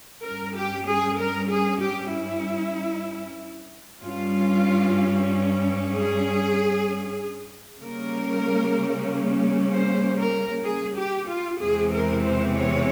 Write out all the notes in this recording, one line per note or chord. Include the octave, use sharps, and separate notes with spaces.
G2 G3 C#4 A#4
G4
G#4
A#4
G#4
G4
E4
G2 G3 C#4 F4
G#4
C#3 G3 A#3 C#4 A#4
C5
A#4
G#4
G4
F4
E2 C3 E3 G#3 C4 G#4
A#4
C5
C#5